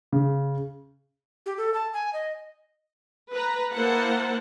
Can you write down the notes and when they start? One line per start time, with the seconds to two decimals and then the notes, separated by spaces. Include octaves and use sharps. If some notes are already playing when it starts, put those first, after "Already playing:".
0.12 C#3
1.46 G4
1.58 A4
1.74 A5
1.93 G#5
2.13 D#5
3.32 B4 A#5
3.73 A#3 E4 A#4 C5 F#5 A5